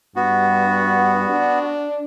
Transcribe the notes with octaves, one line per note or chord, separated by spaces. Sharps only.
G2 B3 F#4
D4